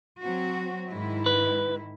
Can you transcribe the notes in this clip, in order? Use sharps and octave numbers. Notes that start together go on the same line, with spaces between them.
F#3 C4 F#4
G#2 D#3 E4
B4